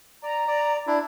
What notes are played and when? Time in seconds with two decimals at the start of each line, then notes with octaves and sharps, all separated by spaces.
0.23 D5 A#5
0.47 D5
0.87 D4 E4